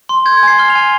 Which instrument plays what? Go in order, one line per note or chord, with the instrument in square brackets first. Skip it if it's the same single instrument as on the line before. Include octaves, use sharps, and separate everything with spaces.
[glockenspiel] C6
G6 G#6
G#6
G#5 C7
F6 G7
F7
G#5 G7